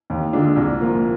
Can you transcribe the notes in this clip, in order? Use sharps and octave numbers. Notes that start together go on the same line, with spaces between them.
D#2
D3 G#3 D4 F4
C2
A#2 F3 A#3 F4